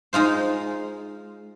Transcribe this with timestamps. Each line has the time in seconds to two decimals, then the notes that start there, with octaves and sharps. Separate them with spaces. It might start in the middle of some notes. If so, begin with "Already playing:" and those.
0.13 G#3 D#4 F4 C5